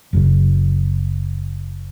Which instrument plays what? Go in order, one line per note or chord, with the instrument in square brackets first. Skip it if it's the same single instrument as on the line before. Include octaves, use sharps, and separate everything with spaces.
[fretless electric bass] F#1 F#2 C#3